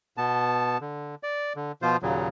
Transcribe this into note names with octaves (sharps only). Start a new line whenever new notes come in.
B2 B3 A5
D3
D5
D3
B2 F3 F4 C5
D#2 A#2 C#3 F#3